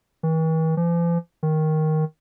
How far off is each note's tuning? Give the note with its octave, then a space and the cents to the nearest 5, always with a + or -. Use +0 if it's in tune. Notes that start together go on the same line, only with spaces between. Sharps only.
E3 -45
F3 -45
D#3 +5